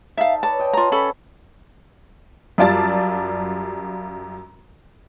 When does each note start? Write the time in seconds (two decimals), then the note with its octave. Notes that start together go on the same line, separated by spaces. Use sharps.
0.17 D#4 A4 E5 F5 A5
0.43 B4 C#5 D5 A5
0.59 D#5 G5
0.73 F4 A#5
0.92 C#4 A4 F5 B5 D6
2.58 F#2 G3 F4 D5 A5 A6